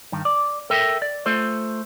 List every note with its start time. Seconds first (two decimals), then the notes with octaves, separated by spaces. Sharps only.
0.12 G2 D#3
0.25 D5
0.70 A4 A#4 E5 G5
1.02 D5
1.26 A3 F4 A4 C5